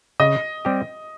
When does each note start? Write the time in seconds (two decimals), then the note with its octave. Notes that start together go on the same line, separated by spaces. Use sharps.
0.20 C#3 D#5
0.65 G3 C4 G4